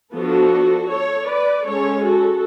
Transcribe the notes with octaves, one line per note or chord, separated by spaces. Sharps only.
F3 B3 D4 F#4 A4
A4 C#5
B4 D5
G#3 C#4 A4 C#5
F#4 A4